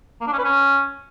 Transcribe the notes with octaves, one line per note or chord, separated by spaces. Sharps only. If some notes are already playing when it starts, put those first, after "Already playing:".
A#3
D4
C#4
B4
C#4